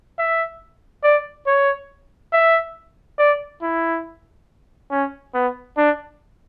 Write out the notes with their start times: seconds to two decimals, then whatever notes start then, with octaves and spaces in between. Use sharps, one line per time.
0.19 E5
1.04 D5
1.47 C#5
2.33 E5
3.19 D5
3.62 E4
4.91 C#4
5.35 B3
5.78 D4